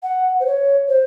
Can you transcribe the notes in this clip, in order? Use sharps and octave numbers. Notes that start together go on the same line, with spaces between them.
F#5
C5
C#5
C5